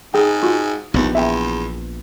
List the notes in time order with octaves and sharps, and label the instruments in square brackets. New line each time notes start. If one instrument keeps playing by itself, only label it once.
[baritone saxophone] G#2 [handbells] G#4 G5
[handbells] F4 F#4
[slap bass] A#1 B3 [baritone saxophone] D#2
[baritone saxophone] E2 [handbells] E5 G5